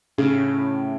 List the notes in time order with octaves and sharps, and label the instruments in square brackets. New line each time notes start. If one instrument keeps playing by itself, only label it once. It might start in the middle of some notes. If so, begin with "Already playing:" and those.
[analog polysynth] A2 [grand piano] C#3